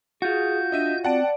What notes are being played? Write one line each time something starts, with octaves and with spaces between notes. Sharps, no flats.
F4 F#4 G#4 G6
D4 D#5 E5 D#7
C4 D5 F#5 A5 D7